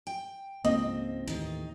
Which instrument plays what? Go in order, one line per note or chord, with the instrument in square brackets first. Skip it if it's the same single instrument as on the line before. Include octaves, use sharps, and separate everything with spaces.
[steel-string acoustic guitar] G5
[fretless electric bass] C#2 G#2 F3 [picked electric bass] A#3 [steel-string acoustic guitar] C4 [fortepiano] D#5
[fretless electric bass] D#2 A2 E3 [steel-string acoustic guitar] D#3 D#4